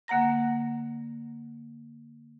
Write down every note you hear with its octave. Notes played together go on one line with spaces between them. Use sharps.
D3 A#3 F#5 A#5 A#6